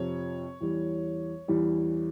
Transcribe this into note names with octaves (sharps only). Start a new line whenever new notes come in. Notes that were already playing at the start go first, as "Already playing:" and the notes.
Already playing: F2 C3 F3 C#5
E2 E3 G3
E2 E3 G3